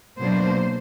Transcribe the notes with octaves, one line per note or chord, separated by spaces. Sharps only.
B2 F#3 A#3 D4 C5